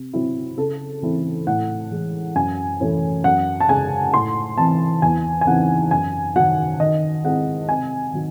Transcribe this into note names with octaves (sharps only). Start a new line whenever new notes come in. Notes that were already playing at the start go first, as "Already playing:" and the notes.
Already playing: C3
F#3 C4 E4
C#3 A4
E3 A3 C4 E4
A2 F#5
E3 G#3
F#2 G#5
E3 A3 C#4 E4
F#2 F#5
A5
C#3 G#3 G#5
A2 C6
E3 C4 A5
E2 G#5
G#5
C#3 E3 C4 D#4 F#5
F#2 G#5
D#3 F#3 F#5
D#3 D#5
G#3 C4 E4 F#5
C3 G#5
D#3 F#3